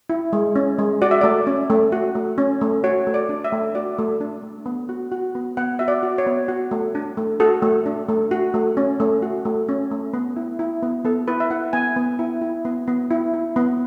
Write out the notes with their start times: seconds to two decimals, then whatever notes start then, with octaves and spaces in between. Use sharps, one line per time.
0.10 E4
0.33 G#3
0.56 C#4
0.79 G#3
1.02 F#4 D5
1.11 E5
1.21 A3 D5
1.47 C#4
1.70 A3
1.92 F#4
2.15 A3
2.38 C#4
2.61 A3
2.84 F#4 C#5
3.07 A3
3.14 D5
3.29 D4
3.44 E5
3.52 A3
3.75 F#4 D5
3.98 A3
4.21 D4
4.43 A3
4.66 B3
4.89 F#4
5.12 F#4
5.35 B3
5.57 B3 F#5
5.79 F#4 E5
5.88 D5
6.03 F#4
6.18 C#5
6.27 B3
6.48 F#4
6.71 A3
6.95 D4
7.17 A3
7.40 F#4 A4
7.62 A3
7.86 D4
8.09 A3
8.31 F#4
8.54 A3
8.77 C#4
9.00 A3
9.22 F#4
9.45 A3
9.69 C#4
9.91 A3
10.14 B3
10.36 E4
10.59 E4
10.83 B3
11.04 B3 A4
11.28 E4 B4
11.40 E5
11.50 E4 F#5
11.73 B3 G#5
11.96 B3
12.19 E4
12.41 E4
12.65 B3
12.88 B3
13.11 E4
13.34 E4
13.56 B3